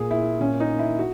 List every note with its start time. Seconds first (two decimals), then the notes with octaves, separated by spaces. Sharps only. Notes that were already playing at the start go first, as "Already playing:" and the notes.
Already playing: A#2 G#4
0.11 E4
0.40 A#2 C#4
0.60 D#4
0.79 E4
0.99 F#4